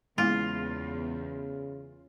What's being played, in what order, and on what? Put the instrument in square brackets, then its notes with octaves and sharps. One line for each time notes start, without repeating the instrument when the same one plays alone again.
[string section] E2 [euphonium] C#3 [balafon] G#3 A#3 E4 [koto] F4